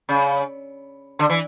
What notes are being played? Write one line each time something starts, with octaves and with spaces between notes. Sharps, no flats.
C#3
D3
E3